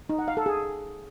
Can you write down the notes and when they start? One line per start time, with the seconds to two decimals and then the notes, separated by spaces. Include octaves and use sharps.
0.09 D#4
0.19 F#5
0.28 F5
0.37 A4
0.46 G#4